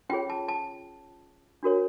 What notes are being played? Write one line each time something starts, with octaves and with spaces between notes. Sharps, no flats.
C#4 F4 G#4 C#5 G5
A5
A5
D4 F#4 A#4 C#5